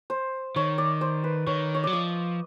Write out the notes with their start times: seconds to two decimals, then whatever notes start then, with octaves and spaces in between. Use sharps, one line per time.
0.10 C5
0.56 D#3 C#5
0.78 D5
1.01 C5
1.24 B4
1.47 D#3 C#5
1.75 C#5
1.84 F#3 D5
1.93 F3 D#5